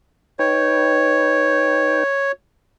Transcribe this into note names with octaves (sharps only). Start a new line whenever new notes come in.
D#4 B4 C#5 G5